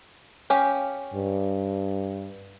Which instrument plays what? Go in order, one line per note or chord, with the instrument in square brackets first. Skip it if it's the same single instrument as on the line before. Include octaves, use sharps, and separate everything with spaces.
[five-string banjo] C#4 G4 F5
[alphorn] G2